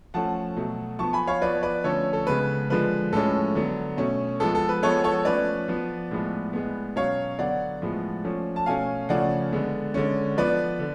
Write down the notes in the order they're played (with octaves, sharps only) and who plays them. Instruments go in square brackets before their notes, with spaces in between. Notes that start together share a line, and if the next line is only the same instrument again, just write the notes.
[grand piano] F3 A3 C#4 F#5 A5
B2 F#3 A3
F3 B3 A5 C#6
G#5 B5
C#5 F5
F3 B3 B4 D5
B4 D5
D3 F3 A3 C#4 A4 C#5
A4
C#3 G#3 B3 B4
D3 F3 G#3 B4
A2 F3 G#3 C#4 A4
D3 F#3 B3
B2 A3 C#4
F3 G#3 B3 A4
A4
B4
F3 G#3 B3 A4 C#5
A4 C#5
F3 A3 C#4 B4 D5
F3 B3
A2 F3 G#3 B3
A2 G#3 B3
B2 F#3 C#4 C#5 F5
D3 F#3 B3 D5 F#5
A2 F3 G#3 B3
F3 A3 C#4
A5
B2 A3 C#4 F5 G#5
C#3 F3 A3 C#4 D5 F#5
D3 G#3 B3
D3 G#3 C#4
F3 B3 B4 D5
D3